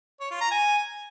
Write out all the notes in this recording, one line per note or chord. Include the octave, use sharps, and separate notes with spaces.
C#5
F4
A#5
G#5